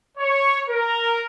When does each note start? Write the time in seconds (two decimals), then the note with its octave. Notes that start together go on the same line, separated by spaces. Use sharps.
0.18 C#5
0.69 A#4